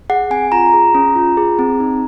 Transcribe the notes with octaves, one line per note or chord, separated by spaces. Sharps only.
G#4 F#5
C4 G#5
F4 A#5
G#4
C#4
F4
G#4
C4
D#4